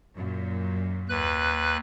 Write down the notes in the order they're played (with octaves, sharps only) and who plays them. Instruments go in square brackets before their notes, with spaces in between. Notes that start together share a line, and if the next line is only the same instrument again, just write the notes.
[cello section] F#2 A#2
[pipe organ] D#2 B4 F#6